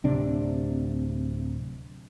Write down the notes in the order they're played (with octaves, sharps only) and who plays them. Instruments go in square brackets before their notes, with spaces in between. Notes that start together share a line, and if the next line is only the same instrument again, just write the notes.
[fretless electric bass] D1 C3 D4